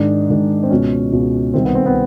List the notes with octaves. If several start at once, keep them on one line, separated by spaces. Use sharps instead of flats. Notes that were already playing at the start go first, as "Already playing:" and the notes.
Already playing: G#2 D#3 D4
G#2 D#3
C4
C#2 B2 C#4
C#2 B2
C2 C3 D#3 C4
B3
C4
B3